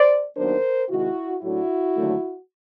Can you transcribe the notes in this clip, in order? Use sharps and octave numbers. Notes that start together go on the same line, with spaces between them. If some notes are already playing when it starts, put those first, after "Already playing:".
Already playing: C5 D5
D#2 D#3 F#3 B3 D4 A#4 C5
C3 D#3 G#3 E4 F#4
A2 F#3 A3 D4 E4 F#4
D#2 D3 F#3 A3